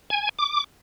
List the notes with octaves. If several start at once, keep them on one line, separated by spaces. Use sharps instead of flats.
G#5
D6